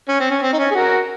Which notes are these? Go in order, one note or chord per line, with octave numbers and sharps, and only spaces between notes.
C#4
C4
C#4
C4
D#4
C#4
G#4
F#4 A#4